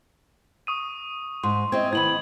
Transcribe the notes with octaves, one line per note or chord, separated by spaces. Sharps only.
C#6 D#6 D#7
G#2 C6
C4 E4 D#5 G#6
D#3 B3 C4 E4 B5 G#6 F#7